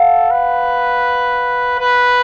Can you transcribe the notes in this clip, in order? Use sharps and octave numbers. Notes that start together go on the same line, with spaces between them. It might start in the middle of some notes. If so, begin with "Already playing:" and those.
Already playing: A4 F5 F#5
B4
B4